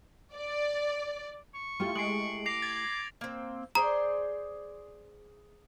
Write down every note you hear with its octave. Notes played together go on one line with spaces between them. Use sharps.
D5
C#6
A3 E4 F4 G4
G#3 C7 D7 F#7
D6 A#6 C7 F7
G#6 A6
A#3 C4
G#4 C5 D5 A#5